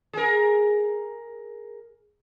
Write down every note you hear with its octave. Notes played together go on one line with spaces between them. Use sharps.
G#4 A#4